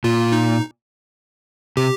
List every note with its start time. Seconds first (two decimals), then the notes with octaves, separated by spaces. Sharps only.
0.04 A#2 F4
0.32 D#4
1.77 C3 G4